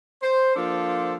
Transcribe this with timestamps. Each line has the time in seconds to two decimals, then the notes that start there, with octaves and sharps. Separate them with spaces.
0.22 C5
0.56 F3 A#3 D4 F4 A4 C5